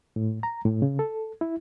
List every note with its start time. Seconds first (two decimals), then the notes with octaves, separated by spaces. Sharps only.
0.16 A2
0.43 A#5
0.65 A2
0.82 C#3
0.99 A4
1.41 E4